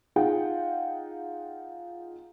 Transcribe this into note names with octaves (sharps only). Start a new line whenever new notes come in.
D#4 F4 G#4 F#5 G5